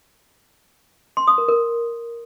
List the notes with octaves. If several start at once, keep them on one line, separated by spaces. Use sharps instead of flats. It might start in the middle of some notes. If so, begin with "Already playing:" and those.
C6
D#6
A#4
A#4